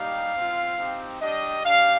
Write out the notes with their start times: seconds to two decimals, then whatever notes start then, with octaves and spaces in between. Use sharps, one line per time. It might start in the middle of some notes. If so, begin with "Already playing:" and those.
Already playing: G3 A#3 D#4 G4 F5
0.34 C4 F4
0.78 C4 D#4 G4
1.21 G3 D4 G4 D#5
1.64 G3 D4 G4 F5